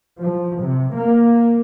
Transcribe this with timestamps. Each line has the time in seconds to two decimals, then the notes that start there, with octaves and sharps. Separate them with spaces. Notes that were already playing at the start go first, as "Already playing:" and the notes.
0.19 F3
0.60 C3
0.93 A#3